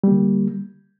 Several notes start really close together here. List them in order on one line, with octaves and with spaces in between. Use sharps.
G3 A#3 D3